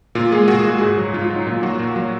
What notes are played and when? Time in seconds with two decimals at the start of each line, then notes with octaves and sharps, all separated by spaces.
0.15 A#2 F4
0.32 G#3 G#4
0.48 A#2 F#4
0.59 G#4
0.65 G#3 F#4
0.78 G#2 G#4
0.88 F#4
0.98 F#3
1.14 G#2 F4
1.24 F4
1.30 F#3
1.35 D#4
1.46 A#2 F4
1.63 F#3 F#4
1.79 A#2
1.96 F#3